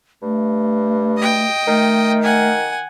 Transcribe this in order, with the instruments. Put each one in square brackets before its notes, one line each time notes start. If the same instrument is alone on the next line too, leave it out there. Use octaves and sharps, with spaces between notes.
[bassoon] G2 [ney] A3
[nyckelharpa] D#5 G5
[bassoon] D#3 [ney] A3
[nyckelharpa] F#5 G#5